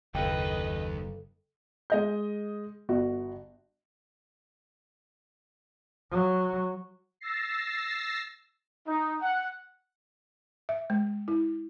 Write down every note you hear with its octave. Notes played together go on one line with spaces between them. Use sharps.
F#1 D#2 A4 B4 D#5 F5 G5
G#3 D#5 G6
G1 F#4
F#3
E6 A6 A#6 C7
D#4
F#5
E5
G#3
E4